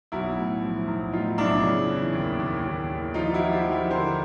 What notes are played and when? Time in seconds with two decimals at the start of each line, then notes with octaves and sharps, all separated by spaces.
0.12 B1 E4 F#4
0.38 A2
0.62 F3
0.88 B1
1.12 A2 D#4 F4
1.38 B1 D4 E4
1.63 C#3
1.88 E3
2.13 D#2
2.40 D#2
2.64 D#2
2.90 D#2
3.14 F3 D#4 F4
3.33 E4 F#4
3.39 F3
3.52 F4 G4
3.65 F3
3.71 E4 F#4
3.90 D3 A#4 C5